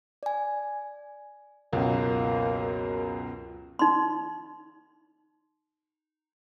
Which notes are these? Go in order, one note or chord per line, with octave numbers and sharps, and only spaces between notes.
D5 G#5
C#2 F#2 B2 A#3
D#4 C6